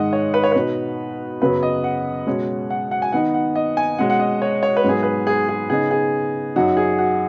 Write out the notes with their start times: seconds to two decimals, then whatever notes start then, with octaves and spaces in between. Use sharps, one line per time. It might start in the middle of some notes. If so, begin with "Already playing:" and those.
Already playing: G#2 D#3 G#3 D#5 F#5
0.13 C#5
0.34 B4
0.44 C#5
0.52 B2 B3 D#4 B4
1.42 F#2 C#3 F#3 B3 B4
1.63 D#5
1.84 F#5
2.27 B2 G#3 C#4
2.70 F#5
2.91 F#5
3.02 G#5
3.12 D#3 B3 D#4 F#5
3.34 F#5
3.55 D#5
3.77 G#5
3.98 B2 G#3 C#4 F#5
4.10 F#5
4.20 D#5
4.42 C#5
4.63 C#5
4.77 B4
4.84 G#2 F#3 B3 G#4
5.03 B4
5.27 G#4
5.49 G#4
5.70 C#3 B3 D#4 G#4
5.91 G#4
6.56 F#2 F#3 D#4 F#4
6.77 G#4
6.99 F#4